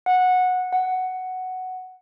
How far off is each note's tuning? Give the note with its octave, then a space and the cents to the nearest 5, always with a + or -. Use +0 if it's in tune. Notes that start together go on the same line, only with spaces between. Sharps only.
F#5 -15
F#5 +5